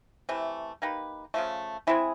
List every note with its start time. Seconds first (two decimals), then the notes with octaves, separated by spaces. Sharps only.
0.29 C3 E3 A3
0.82 A#3 D#4 G4 B4
1.34 C#3 F3 A3
1.87 G#3 C4 E4 G#4